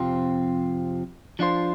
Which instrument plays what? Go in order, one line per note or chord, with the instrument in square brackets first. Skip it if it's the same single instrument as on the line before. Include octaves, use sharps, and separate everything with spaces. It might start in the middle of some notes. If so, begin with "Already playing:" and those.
Already playing: [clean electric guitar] F2 C3 F3 C4 F4
F3 D4 F4 C5